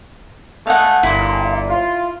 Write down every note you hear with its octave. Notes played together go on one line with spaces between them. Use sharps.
B2 G#3 A3 F5 F#5
G1 A#2 E4
F4